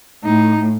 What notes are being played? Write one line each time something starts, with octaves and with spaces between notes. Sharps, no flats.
A2 D#4